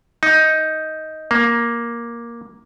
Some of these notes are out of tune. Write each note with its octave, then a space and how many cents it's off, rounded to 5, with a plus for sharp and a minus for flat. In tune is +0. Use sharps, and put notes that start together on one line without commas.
D#4 +10
A#3 +10